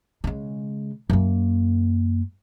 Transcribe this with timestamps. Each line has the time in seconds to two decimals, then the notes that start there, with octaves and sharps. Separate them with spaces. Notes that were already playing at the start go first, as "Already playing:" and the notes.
0.24 C#3 G#3
1.10 F#2 A#3